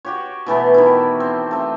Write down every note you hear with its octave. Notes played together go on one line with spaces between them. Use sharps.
F#4 G4 C#5
B2 E3 A3 B3
D#3 E3 E4
C4
A3 C4